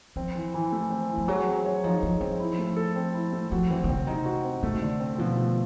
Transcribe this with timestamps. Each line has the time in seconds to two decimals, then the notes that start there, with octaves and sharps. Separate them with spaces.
0.16 F3 C4
0.35 E3
0.54 E3
0.72 A3
0.90 C4
1.10 E3
1.18 F3
1.28 F#3 G#4
1.46 C4
1.65 C#5
1.84 F3 D#4
2.03 F3 G#4
2.20 F3 C4
2.40 E4
2.59 A3
2.76 A4
2.96 C4
3.14 E4
3.33 A3
3.52 F3 F#4
3.70 E3 C4
3.84 D3
3.89 C#3 C4
4.07 C3 D#4
4.25 F#4
4.44 C4
4.63 C3 A3
4.82 D3
5.00 C4
5.18 B2 F3
5.37 A3